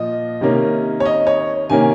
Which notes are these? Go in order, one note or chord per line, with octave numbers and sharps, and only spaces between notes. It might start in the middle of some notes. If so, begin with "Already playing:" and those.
Already playing: A#2 F3 D#5
C3 D#3 A#3 C#4
C#5
D#5
C#5
C3 D#3 A#3 C#4 G#5